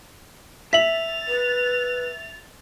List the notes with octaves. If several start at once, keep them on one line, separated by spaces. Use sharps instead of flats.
E5 A6 B6 F7 F#7
B4